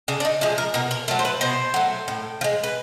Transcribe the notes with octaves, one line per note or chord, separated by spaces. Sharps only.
C#3 D4
D4
D#4
F3 G#3 E4
A#4
B2 A#4
A#4
F#3 A3 A#4
C5
B4
B2 C5
F#3 A3
A2
F3
G#3
B4